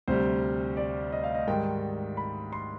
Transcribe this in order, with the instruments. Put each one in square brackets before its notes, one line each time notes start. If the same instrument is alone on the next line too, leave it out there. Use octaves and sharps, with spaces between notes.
[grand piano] D2 C3 G3 C5
D5
D#5
F5
D#5
G#2 D#3 G3 G5
B5
C6